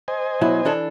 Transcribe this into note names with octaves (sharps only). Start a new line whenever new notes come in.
C5 D#5 G#5
B2 F#3 E4
E3 D4 A4